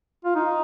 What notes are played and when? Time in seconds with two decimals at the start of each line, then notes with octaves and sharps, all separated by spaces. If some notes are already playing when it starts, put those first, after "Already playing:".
0.24 F4
0.35 D#4